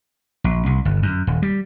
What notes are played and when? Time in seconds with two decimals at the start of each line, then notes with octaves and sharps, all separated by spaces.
0.44 A#1
0.66 C2
0.85 G1
1.03 F#2
1.27 D#1
1.42 G3